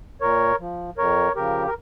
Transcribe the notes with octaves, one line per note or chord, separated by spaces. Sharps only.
A#2 A#4 C#5
F3
F2 A#4 C#5
C#3 F3 G4 A#4
A#4